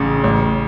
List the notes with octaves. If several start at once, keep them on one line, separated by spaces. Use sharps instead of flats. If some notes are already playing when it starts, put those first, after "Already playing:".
Already playing: A1 C#3
A1